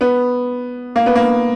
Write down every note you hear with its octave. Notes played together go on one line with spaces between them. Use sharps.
B3
A#3
B3
A#3